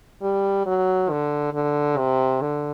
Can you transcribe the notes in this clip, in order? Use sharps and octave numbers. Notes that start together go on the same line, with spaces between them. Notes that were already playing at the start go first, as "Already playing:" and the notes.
G3
F#3
D3
D3
C3
D3